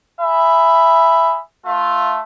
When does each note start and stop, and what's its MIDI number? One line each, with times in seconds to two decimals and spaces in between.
0.20 1.39 68
0.20 1.39 76
0.20 1.39 83
1.65 2.20 57
1.65 2.20 65
1.65 2.20 76
1.65 2.20 81